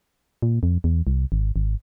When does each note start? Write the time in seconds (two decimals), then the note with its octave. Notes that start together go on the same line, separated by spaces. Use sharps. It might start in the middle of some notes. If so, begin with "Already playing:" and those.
0.42 A#2
0.63 F2
0.84 E2
1.07 C2
1.32 G#1
1.56 G#1